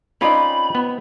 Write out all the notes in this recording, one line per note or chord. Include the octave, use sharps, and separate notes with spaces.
C4 C#4 D#4 F4 D5 B5
B3